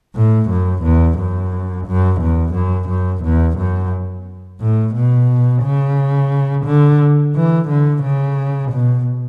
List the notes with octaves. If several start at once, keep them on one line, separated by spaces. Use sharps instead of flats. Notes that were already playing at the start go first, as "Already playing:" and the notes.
A2
F#2
E2
F#2
F#2
E2
F#2
F#2
E2
F#2
A2
B2
C#3
D3
E3
D3
C#3
B2